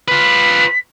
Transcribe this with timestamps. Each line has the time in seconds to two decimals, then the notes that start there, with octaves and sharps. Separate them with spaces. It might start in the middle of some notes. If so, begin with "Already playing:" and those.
0.08 F4 B4 B6